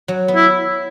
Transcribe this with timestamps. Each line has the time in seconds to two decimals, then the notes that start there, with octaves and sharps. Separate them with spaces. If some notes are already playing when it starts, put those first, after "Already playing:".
0.08 F#3
0.28 B3
0.35 E4